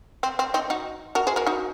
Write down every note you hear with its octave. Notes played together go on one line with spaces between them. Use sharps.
C4
C4
C4 D#4
D#4 F#4
F#4 A#4
G#4 C5
F#4 A#4
D#4 F#4